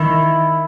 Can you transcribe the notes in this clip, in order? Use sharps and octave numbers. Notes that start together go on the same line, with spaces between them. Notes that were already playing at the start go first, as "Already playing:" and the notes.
Already playing: D#3 E4